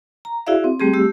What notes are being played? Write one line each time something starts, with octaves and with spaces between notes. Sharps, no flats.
A#5
E4 F#4 G#4 D5 E5 F5
C4
G3 A3 C4 G4 G#4
A3 G4 E6